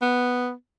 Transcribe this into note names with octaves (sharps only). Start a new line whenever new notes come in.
B3